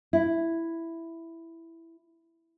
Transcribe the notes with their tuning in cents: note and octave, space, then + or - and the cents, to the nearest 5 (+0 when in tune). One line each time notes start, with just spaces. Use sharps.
E4 +5